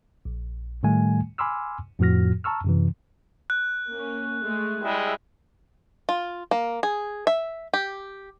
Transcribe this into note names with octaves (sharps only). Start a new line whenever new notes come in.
A#1
A2 D#3 G3 A3 G#5
G#5 B5 C6 D6 E6 F6
F2 A2 F3 F#4 F6 A#6
A5 A#5 C#6 E6 F6
F#2 C3 E3
F#6
A#3 C#4
G#3 A3 G#4
G3 G#3 E4 E5
F4
A#3
G#4
E5
G4